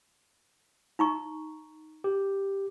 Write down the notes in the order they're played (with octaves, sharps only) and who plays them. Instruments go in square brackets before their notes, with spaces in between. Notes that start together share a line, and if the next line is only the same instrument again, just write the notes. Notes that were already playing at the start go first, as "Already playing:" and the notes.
[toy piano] D#4 A#5 C#6
[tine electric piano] G4